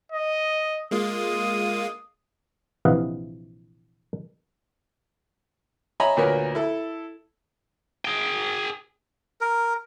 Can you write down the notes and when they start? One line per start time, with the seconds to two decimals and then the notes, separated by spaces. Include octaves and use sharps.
0.12 D#5
0.91 G#3 A#3 F4 D#6
2.85 A#1 C3 E3 D#5 F5 F#5
6.00 C#5 D#5 E5 G#5 A#5 B5
6.17 D2 A#2 A#4 B4 C#5
6.55 E4 A4
8.05 G#4 G5
9.41 A#4